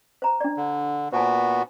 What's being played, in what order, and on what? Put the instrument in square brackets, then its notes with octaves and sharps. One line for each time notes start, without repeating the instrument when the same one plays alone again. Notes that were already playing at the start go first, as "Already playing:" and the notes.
[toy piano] C5 A#5
D4 D5
[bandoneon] D3
[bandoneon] A#2 B3 F#4 [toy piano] C5 G#5 A5